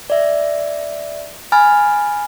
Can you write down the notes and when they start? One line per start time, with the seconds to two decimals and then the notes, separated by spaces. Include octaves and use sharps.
0.10 D5 E5
1.52 G#5 B5 F6 A6